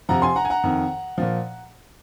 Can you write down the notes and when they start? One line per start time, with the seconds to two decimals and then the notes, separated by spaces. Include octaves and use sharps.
0.09 F2 C3 F3 F#5 A#5
0.22 G#5 C6
0.36 F#5 A#5
0.45 G#5
0.50 F#5 A#5
0.63 F2 D#3
1.18 A#2 F3